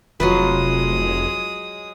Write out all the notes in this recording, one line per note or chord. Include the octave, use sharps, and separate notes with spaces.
F1 F#3 G#3 F4 B4 D#6